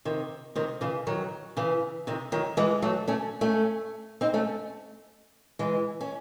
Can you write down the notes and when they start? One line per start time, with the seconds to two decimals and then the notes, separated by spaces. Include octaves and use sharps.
0.05 C3 D#3
0.55 C3 D#3
0.81 C#3 E3
1.07 D#3 F#3
1.57 C#3 E3
2.07 C3 D#3
2.32 D#3 F#3
2.57 E3 G#3
2.82 F#3 A3
3.08 A3 C#4
3.41 A3 C#4
4.21 C4 D#4
4.34 A3 C#4
5.59 E3 G#3
6.01 C#4